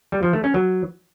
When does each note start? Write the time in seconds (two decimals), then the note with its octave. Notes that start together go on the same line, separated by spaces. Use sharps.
0.12 G3
0.23 F3
0.33 A3
0.44 C#4
0.54 F#3